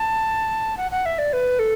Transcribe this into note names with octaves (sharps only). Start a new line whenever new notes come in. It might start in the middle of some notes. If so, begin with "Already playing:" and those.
Already playing: A5
F#5
F#5
E5
D5
B4
A4